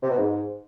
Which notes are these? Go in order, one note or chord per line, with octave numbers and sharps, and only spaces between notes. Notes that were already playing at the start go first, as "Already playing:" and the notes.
C3
B2
G#2